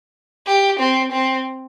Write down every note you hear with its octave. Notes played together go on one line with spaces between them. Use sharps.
G4
C4
C4